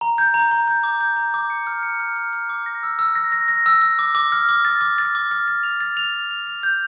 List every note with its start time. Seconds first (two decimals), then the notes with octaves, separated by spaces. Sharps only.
0.01 A#5
0.18 G6
0.34 A#5
0.51 A#5
0.68 G6
0.83 D6
1.01 G6
1.16 A#5
1.34 D6
1.50 C#7
1.67 F6
1.83 C#7
2.00 F6
2.16 F6
2.33 F6
2.49 D6
2.66 A#6
2.83 E6
2.99 E6
3.15 A#6
3.32 A#6
3.48 A#6
3.66 E6
3.82 E6
3.99 D6
4.15 D6
4.32 F6
4.49 D6
4.65 A6
4.81 D6
4.98 A6
5.15 D6
5.31 F6
5.48 A6
5.63 F7
5.81 A6
5.97 F7
6.14 A6
6.31 F7
6.47 F7
6.63 G6